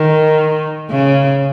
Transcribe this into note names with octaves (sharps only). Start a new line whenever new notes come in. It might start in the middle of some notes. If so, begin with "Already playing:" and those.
Already playing: D#3
C#3